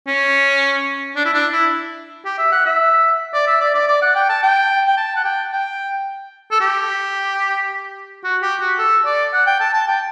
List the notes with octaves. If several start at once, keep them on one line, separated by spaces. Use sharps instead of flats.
C#4
D4
E4
D4
E4
G4
E5
F#5
E5
D5
E5
D5
D5
D5
F#5
G5
A5
G5
G5
A5
F#5
G5
G5
A4
G4
F#4
G4
F#4
A4
D5
F#5
G5
A5
A5
G5